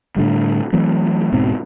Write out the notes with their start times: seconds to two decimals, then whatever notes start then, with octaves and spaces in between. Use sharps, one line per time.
0.16 A2 D3 G3
0.73 E3 F#3 A3 C4
1.32 E1 G#2 B2 C4